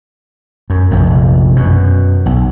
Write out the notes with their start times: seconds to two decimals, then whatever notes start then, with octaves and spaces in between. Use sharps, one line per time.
0.70 F#2
0.91 F1 A#1 F2
1.56 F#2 B2
2.26 B1